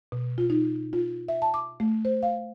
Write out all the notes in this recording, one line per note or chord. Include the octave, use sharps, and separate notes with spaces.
B2
F4
D#4
F4
E5
A5
D6
A3
C5
F5